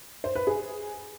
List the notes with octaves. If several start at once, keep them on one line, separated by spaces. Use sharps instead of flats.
C5
B4
G#4